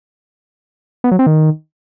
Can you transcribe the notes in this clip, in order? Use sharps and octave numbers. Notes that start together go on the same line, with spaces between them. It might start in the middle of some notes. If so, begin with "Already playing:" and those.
B3
F#3
C4
D#3